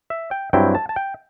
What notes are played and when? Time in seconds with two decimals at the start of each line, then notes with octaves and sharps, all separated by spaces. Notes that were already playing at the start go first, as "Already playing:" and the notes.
0.10 E5
0.31 G5
0.53 G2 F#3 C4 E4 G5
0.75 A5
0.89 A5
0.96 G5